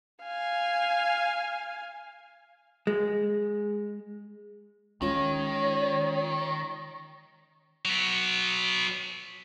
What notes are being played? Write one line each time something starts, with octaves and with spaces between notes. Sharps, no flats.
F5 G#5
G#3
D#3 E3 G#3 C#4 F4 C#5
F#3 B3